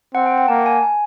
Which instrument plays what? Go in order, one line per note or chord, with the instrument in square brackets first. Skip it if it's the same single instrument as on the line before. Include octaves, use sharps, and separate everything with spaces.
[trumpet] C4 [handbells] F#5
[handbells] G5
F#5
[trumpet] A#3 [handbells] A5
[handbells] G#5
G#5